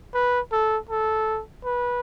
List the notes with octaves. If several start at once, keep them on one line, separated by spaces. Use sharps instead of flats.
B4
A4
A4
B4